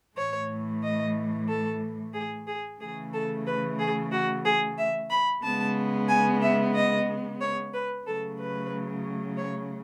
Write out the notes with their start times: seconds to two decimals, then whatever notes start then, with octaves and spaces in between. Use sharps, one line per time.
0.17 A2 E3 A3 C#5
0.83 D#5
1.49 A4
2.14 G#4
2.47 G#4
2.81 C#3 E3 A3 G#4
3.14 A4
3.47 B4
3.80 G#4
4.12 F#4
4.45 G#4
4.78 E5
5.10 B5
5.43 C#3 G#3 B3 A5
6.09 G#5
6.42 E5
6.75 D#5
7.41 C#5
7.74 B4
8.07 C#3 F#3 A3 A4
8.40 B4
9.38 C#5